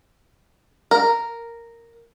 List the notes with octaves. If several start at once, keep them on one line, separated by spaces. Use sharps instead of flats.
A#4